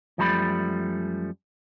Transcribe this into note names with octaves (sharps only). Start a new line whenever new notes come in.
F#2 F3 G3 A3 A#5 B5